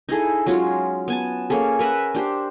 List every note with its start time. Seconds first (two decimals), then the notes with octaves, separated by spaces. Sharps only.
0.09 D#4 E4 G#4 A4
0.46 F#3 G#3 C#4 F4
1.08 B3 G#5 A5
1.50 A#3 C#4 G#4 A4
1.79 A#4 B4 E5 F#5
2.14 D4 G4 C5